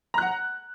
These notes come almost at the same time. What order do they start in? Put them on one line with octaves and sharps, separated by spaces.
A#5 F#6 F#5